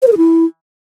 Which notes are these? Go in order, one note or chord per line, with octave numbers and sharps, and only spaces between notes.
C5
A#4
G#4
E4